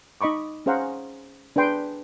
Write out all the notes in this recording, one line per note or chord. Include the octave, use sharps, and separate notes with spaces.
D#4 D#5 B5 C#6 D6
C#4 G#4 C5 F5 F#5 A#5
D4 G#4 B4 G5 C6